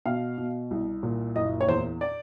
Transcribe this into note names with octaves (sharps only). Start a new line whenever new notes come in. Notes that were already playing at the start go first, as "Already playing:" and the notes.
B2 F5
B2
C2
A#2
F#1 D#5
C#5
E2 C5
D5